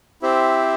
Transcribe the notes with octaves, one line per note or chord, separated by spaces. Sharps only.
C4 E4 G4 C5 E5